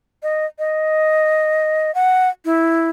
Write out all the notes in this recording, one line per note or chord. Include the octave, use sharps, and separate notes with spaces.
D#5
D#5
F#5
E4